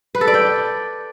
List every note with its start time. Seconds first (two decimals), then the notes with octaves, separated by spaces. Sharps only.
0.15 B4
0.21 A4
0.27 D5
0.34 G5